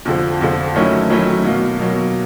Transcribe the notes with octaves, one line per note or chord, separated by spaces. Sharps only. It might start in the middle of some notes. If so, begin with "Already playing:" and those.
F2 D3 F3
F2 D3 F3
D#3 F#3 A3 C#4 E4
D#3 F#3 A3 C#4 E4
B2 F#3 A#3
B2 F#3 A#3